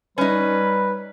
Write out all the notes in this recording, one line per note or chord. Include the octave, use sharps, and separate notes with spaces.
G3 C#4 D#4 B4